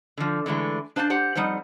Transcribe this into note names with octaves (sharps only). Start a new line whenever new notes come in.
D3 F3
D3 E3 G#3 A3
D4 C5 F5 G5 A5
G4 C5 F#5
F2 G3 D#4 C5 F#5